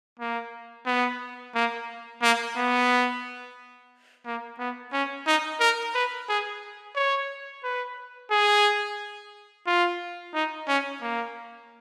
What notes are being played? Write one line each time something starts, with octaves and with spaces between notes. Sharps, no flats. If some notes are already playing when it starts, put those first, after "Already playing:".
A#3
B3
A#3
A#3
B3
A#3
B3
C#4
D#4
A#4
B4
G#4
C#5
B4
G#4
F4
D#4
C#4
A#3